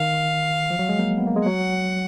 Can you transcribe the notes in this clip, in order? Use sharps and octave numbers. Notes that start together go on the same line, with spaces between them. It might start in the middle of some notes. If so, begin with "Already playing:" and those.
Already playing: D#3 F5
F3
F#3
G#3
A#3
B3
A#3
G#3
F#3 F#5